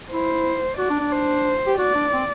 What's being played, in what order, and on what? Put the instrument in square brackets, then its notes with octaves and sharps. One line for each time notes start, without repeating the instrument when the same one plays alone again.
[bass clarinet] E4 [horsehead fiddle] C5
[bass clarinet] F#4 [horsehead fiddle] D5
[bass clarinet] D4
D4
[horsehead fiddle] C5
[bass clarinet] G4
[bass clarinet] F#4 [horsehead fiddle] D5
[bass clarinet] D4
C4